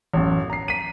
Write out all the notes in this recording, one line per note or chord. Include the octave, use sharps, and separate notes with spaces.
A1 F#2
A#5 C7
B6 D#7